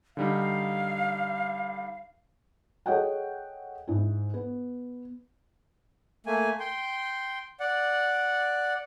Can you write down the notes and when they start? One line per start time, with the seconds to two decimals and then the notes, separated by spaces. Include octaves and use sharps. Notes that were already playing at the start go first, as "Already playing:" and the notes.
0.17 D3 G3 D#4 F5
2.86 G#4 A4 C#5 D#5 F#5 G5
3.88 G#2 E4
4.34 B3
6.26 A3 A#3 G#5
6.60 G5 C6
7.60 D5 F#5